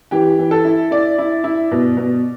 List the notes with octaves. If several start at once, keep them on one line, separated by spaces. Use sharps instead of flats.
E3 G4
E3
A4
E4
E4 D5
E4
E4
B2
B2